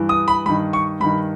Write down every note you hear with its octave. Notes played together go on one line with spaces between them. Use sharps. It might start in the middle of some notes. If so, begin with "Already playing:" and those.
Already playing: G2 E3
D#6
B5
G2 D#3 B5
C#6
G2 D#3 B5